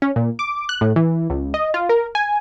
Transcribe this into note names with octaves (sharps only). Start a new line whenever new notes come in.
C#4
A#2
D6
F#6
A2
E3
C#2
D#5
F4
A#4
G#5